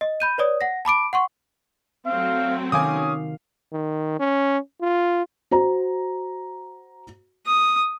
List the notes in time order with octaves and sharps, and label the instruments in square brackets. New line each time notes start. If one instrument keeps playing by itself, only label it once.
[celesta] D#5
B5 G6 D#7
B4 C#5 D5 D#6
F#5 A#6
A5 B5 D6 D7
F#5 C6 C#6
[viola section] F#3 A3 C4 [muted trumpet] F5
[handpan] C3 D#3 F5 [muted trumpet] C#4 [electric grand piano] G#5 D6 D#6
[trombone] D#3
C#4
F4
[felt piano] F#4 C5 A#5
[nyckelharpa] D#6